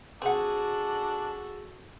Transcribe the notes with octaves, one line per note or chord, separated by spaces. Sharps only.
C4 D4 F#4 G#4 A4 F#5